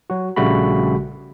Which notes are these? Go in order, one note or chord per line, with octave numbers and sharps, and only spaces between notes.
F#3 F#4
A#1 C#3 G3 A3 F#4 B5